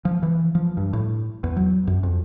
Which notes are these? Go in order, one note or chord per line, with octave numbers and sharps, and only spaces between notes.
F3
E3
F3
G2
A2
E2
F#3
F#2
F2